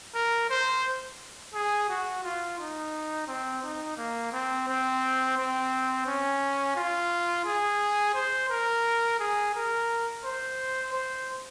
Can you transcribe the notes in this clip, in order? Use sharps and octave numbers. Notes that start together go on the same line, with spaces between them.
A#4
C5
G#4
F#4
F4
D#4
C4
D#4
A#3
C4
C4
C4
C#4
F4
G#4
C5
A#4
G#4
A#4
C5
C5